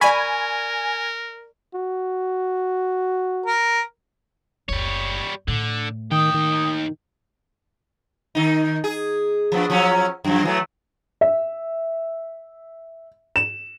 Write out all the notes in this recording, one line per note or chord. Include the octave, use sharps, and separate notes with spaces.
A#4 D5 G#5 B5 C#6
F#4
A#4
F#1 D2 G3 C#5
A2 D3
D#2 D#3 G5 D#6
D#3
D#3 D#4
G#4
F3 B3 D4
F3 F#3 C#4
F#2 F3
E3 F#3 A3
E5
E7